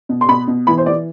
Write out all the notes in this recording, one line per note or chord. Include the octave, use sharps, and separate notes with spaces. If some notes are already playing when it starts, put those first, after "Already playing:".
B2
C6
B2 B5
B2
E3 B5
C5
E3 D5